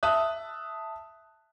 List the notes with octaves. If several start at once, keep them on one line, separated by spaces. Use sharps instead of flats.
E5 A5 D#6 F#6